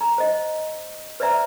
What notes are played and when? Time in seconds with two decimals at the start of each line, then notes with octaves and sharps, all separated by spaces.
0.01 A#5
0.18 C5 D#5
1.20 B4 C5 D5 E5 A#5